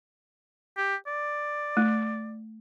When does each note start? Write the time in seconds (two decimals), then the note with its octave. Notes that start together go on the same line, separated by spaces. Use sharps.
0.78 G4
1.07 D5
1.77 A3